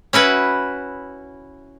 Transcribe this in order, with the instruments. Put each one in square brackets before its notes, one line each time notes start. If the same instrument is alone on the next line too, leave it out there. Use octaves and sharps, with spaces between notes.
[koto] C#4 E4 F#4 B4